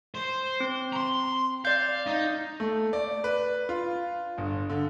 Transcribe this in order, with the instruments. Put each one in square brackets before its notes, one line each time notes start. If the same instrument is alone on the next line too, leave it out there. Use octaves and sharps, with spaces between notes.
[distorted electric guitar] C5
[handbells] C4
[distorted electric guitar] A#5 C6
[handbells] D5 G6 [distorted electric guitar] F5
[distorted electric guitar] D#4
[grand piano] A3
D5
B4
F4
G1
D3